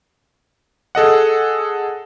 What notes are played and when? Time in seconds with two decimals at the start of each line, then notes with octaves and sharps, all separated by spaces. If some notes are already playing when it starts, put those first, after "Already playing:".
0.95 G#4 A4 D#5 F#5